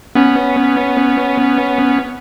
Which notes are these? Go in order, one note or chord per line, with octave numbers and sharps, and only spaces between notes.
B3 C#4